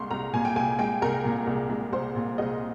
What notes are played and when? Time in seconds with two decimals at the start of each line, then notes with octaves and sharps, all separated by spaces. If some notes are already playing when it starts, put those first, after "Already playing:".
Already playing: C2 A#2 G#3 C6 C#6
0.11 C2 A#5
0.33 A#2 G#5
0.45 G5
0.56 C2 G#5
0.79 G#3 G5
1.02 C2 A#4
1.25 A#2
1.47 C2
1.70 G#3
1.93 C2 C5
2.16 A#2
2.38 C2 D#5